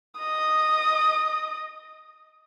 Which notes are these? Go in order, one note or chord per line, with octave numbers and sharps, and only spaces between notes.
D#5 D#6